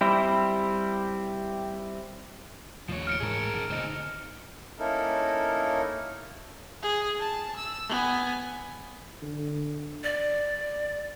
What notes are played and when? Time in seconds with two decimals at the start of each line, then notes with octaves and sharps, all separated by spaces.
0.01 G3 C4 E4
2.89 D#2 C#3 F3 A3 C#5
3.07 F6 C#7 D7
3.20 A1 G#2 G#3 G#4 A#4
3.53 G#1 C#3
3.70 D2 B2 D#3 C4 D#4
4.79 A#3 C#4 D#4 E4 A4 A#4
6.83 G#4
7.19 A5
7.57 E6
7.89 B3 G#5
9.22 D3
10.04 D5